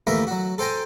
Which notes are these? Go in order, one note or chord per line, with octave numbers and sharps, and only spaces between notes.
D#2 E3 A3 A#4 E5 A#5
F#3 F#4
A4 C5 G5 G#5 A#5